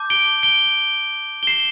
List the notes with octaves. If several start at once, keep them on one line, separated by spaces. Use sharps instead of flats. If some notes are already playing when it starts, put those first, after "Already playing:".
Already playing: A5 D6 G6
D7 G7
D7 G7
G7
C7 E7